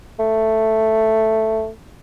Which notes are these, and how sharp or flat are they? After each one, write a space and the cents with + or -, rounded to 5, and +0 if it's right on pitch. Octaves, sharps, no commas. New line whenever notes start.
A3 +5